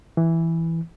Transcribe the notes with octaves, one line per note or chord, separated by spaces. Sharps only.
E3